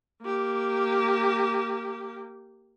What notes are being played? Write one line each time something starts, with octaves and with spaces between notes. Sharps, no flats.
A#3 G4